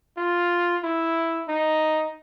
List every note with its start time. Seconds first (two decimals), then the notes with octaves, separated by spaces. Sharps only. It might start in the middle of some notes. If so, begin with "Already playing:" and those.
0.17 F4
0.83 E4
1.48 D#4